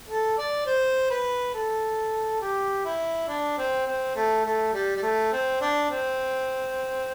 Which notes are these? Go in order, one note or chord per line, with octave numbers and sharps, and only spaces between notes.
A4
D5
C5
B4
A4
G4
E4
D4
C4
C4
A3
A3
G3
G3
A3
C4
D4
C4